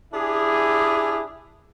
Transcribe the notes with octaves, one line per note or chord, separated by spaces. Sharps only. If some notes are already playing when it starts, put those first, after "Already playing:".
D4 E4 G4 G#4